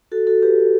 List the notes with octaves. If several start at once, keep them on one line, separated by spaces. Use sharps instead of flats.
F#4 A4
F#4 A4
G4 B4